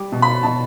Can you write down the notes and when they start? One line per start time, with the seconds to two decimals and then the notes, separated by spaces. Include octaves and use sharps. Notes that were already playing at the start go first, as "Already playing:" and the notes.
Already playing: G3 D6
0.12 B2
0.22 B5
0.43 B2 A5